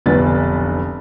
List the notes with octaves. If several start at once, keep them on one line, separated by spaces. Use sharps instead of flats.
F1 B1 D3 B3 B4 A6